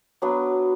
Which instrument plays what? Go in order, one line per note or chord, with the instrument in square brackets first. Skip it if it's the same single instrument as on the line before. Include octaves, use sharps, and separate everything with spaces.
[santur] F#3 B3 D4